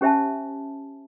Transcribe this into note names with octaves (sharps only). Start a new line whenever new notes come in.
C#4 G4 C5 E5 G#5 A5